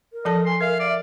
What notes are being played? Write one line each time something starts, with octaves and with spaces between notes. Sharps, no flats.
A#4
F3 A4 D#5 A5
G#5 C6
A#4 E5 F5
D5